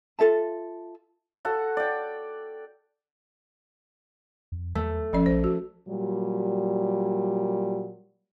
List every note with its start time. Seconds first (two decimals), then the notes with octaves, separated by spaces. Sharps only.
0.19 F4 A4 E5 A5
1.45 F#4 A4 F#5
1.77 D5 G5
4.52 F2
4.75 E2 A3
5.13 G1 F3 C#4 D5
5.26 A#1 C5
5.44 F#4
5.88 A#2 F#3 G3